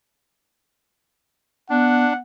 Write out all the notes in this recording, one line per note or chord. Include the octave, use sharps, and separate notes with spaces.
B3 D4 F#5